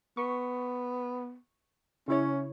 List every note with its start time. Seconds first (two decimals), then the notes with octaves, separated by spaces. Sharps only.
0.17 B3 C#6
2.08 C#3 C#4 E4 C#5